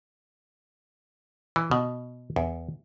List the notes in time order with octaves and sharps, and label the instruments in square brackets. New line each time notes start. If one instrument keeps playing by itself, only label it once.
[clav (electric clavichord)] E3
B2
E2